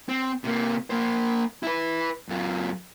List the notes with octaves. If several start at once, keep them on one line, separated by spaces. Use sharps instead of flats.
C4
C3 A#3
A#3 C5
E4 B4
F#2 F4